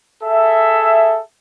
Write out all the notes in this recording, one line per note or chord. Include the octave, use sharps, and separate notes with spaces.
G#4 A4 E5